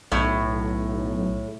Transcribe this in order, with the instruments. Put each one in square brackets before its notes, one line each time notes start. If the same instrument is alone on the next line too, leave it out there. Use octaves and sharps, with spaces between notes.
[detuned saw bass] B1 [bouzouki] A2